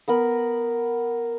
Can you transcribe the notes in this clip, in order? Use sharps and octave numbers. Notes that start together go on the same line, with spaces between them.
B3 A#4 B5